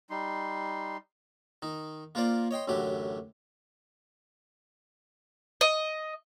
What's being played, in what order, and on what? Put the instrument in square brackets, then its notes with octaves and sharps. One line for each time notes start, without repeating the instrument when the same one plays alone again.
[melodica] G3 D#4 C6
[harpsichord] D#3 D#4
A#3 F4 A#4 C5 D5
C#5 D#5 G5 C6
A1 F#2 D3 F#3 G4
[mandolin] D#5